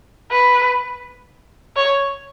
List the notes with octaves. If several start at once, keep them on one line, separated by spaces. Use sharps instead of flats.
B4
C#5